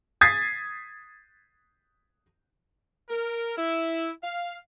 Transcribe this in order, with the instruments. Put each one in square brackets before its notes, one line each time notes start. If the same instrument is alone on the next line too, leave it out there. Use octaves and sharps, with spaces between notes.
[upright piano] D#6 G#6 A6 B6 C7
[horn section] A#4
E4
F5